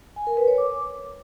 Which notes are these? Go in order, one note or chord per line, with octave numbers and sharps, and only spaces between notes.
G#5
A#4
B4
C#5
D6